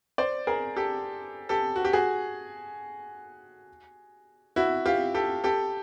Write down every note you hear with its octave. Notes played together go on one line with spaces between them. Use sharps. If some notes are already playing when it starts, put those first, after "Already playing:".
C5 D5
G#4 A#4
G4 A4
G4 A4
F#4
G4
F#4 G#4
E4 F#4
F4 G4
G4 A4
G4 A4